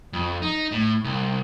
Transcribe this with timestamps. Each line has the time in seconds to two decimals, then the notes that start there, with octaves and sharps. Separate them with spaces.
0.13 F2
0.42 D#4
0.72 A2
1.04 C2